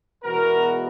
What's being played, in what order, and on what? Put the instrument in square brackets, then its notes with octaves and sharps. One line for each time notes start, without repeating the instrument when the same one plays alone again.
[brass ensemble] E2 B2 G#3 B3 F#4 A#4